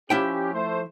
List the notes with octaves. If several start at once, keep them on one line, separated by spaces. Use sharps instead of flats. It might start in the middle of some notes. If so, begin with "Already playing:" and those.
F3 C#4 E4 G4 G5
A3 C5